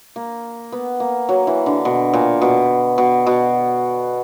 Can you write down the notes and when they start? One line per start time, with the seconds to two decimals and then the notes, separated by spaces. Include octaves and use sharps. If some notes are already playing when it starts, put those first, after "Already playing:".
0.16 A#3
0.72 B3
1.00 A#3
1.29 F#3
1.47 E3
1.66 D3
1.85 B2
2.13 A#2
2.42 B2
2.98 B2
3.26 B2